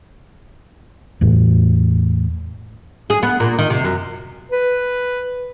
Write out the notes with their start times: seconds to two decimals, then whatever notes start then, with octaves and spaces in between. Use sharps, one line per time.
1.21 E2 A2
3.10 G#4
3.23 B3
3.40 A#2
3.59 D#3
3.70 C3
3.84 F#2
4.51 B4